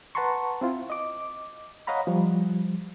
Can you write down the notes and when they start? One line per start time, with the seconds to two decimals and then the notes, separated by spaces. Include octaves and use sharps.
0.15 B4 F#5 A5 A#5 C6 C#6
0.61 C4 E4 F4
0.90 D#5 D6
1.87 C#5 D#5 F5 F#5 A#5 B5
2.07 F3 G3